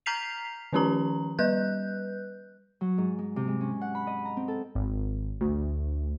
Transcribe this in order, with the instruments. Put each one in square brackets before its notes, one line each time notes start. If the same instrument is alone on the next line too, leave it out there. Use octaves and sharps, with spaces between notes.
[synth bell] A#5 F6 G6 B6 C7 F7
D#3 F3 C#4 D#4 G4 A#5
G3 B4 F#6 G6
[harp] F#3
G#2
G#3
C3
G#3
C#4
F#5
B5
D#5
A#5
C4
A4
[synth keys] G#1
D2